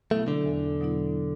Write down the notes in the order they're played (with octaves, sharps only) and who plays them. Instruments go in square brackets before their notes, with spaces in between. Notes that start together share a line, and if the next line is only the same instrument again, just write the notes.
[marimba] B2 F#3 B3 E4 [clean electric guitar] A3
[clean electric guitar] D3
[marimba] E2
B2 F#3 B3 E4